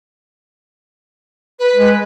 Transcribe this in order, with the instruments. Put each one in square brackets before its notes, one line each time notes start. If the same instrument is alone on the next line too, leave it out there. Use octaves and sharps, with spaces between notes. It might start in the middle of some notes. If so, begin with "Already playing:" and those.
[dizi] B4
[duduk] G#3